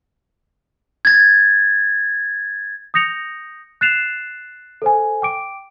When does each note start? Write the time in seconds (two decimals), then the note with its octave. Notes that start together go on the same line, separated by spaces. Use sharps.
1.05 G#6 A6
2.94 D#6 G6 A#6 C#7 F7
3.81 F#6 A6 C7 E7 F7
4.82 A4 C5 G#5
5.22 G5 D6 D7